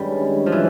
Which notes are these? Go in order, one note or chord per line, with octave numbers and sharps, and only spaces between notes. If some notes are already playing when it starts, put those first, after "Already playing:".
Already playing: G2 D#3 G3 G#3 C#4
F3
E3